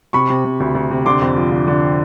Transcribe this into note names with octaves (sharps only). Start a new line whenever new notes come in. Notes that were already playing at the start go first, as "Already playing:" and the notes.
C3 B5 C#6
C3
C3
D2
D2
C3
D3 C6 D6
F2
F3
D3
D3